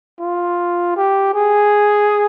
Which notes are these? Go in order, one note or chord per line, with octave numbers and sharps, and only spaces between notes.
F4
G4
G#4